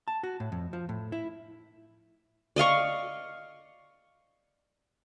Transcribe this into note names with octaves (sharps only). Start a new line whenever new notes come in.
A5
F#4
A2
F2
F3
A2
E4
D5 D#5 F5 C#6